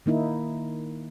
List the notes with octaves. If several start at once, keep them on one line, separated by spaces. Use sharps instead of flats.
D#3 A#3 D#4 E4